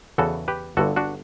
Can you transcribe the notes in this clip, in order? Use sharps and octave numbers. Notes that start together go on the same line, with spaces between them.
E2 C#3 E3 F#4 A4
G4 B4
G1 G2 D3 F#4 A4
D4 F#4